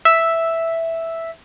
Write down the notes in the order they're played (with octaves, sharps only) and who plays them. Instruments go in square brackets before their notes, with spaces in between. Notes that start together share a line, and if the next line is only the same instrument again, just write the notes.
[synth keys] E5